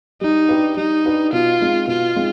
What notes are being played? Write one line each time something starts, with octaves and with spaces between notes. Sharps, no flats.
G3 D#4
D4 G4 B4
G3 D#4
D4 G4 B4
B2 F4
G#3 C4 D#4
B2 F4
G#3 C4 D#4